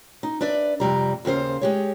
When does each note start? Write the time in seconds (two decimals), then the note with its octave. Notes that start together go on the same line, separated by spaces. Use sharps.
0.23 D#4
0.41 D4 B4 D5 E5
0.80 F2 C3 G3 A#5
1.25 D#2 C#3 F#4 C5 F5
1.61 G#3 G4 C#5